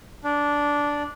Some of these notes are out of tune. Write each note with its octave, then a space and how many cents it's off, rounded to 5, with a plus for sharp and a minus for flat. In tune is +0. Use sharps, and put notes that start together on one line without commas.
D4 -10